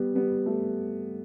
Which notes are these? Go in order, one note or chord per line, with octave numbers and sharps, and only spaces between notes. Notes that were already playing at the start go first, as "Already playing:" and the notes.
Already playing: G3 B3
G3 B3
A3